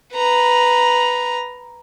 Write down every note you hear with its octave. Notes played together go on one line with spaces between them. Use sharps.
B4 A#5